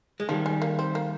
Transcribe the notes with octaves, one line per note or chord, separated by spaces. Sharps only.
G#3
D#3 F3 G3
G#3
A#3
C4
A#3